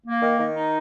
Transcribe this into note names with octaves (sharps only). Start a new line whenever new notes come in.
A#3
D#3
D#3
D#4